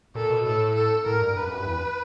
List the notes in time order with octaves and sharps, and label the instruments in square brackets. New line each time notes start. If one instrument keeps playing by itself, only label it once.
[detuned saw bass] A#2 [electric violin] A4
[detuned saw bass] B2
[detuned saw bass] A2 [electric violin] A4
[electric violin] A4
[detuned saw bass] A2 [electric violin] A#4
[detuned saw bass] G2
[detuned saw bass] G2 [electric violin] B4
[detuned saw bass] F2
F#2
G2
E2